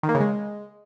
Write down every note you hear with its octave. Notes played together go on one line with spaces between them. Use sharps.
D#3
A#3
C#3
G#3